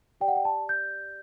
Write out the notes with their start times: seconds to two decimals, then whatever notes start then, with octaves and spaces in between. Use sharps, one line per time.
0.21 G4 D5 G5
0.28 F#5
0.36 G5
0.45 A5
0.69 G6